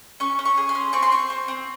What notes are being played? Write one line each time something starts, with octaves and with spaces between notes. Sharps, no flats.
C#4 C#6
C#4
C#6
G#4
C6
C#4
C4 C#6
C6
C4 C#6
C4
C4